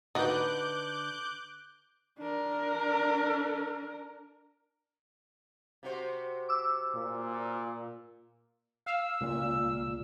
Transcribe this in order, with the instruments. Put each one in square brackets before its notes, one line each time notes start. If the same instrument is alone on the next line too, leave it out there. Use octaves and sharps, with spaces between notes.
[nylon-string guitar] D3 B4 [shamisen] D#4 F#4 [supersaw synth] D6 F#6 G6
[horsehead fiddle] D4 A#4
[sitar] C3 F#4 C5
[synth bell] D6 E6
[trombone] A#2
[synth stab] F5 [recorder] E6
[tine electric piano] C#2 A#2